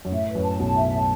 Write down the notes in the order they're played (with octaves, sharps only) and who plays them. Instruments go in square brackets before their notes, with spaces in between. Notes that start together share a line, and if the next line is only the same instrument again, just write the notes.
[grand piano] F#2
[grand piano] A2 [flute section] E5
[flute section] B4
[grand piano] F#2
[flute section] A5
[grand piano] B1 B2 [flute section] A5
[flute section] E5
A5